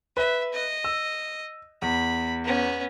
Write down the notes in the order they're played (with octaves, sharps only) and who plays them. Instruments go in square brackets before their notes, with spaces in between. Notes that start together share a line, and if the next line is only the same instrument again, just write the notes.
[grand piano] B4 [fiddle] E5
[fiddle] D#5
[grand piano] E6
[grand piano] E2 [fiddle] B5
[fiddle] B3 C#4